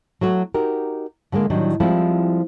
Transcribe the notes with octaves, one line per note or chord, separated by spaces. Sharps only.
F#3 A3 F#4
D#4 F#4 G4 A#4
D3 G3 G#3 A#3
A2 D#3 F#3 G3 D4
F3 G3 G#3 C4 E4 F4